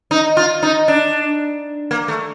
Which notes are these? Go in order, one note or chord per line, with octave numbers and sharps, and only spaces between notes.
D#4
F4
D#4
D4
A#3
A3